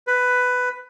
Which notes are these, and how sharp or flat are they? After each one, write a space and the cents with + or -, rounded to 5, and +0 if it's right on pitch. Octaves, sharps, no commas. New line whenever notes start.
B4 +10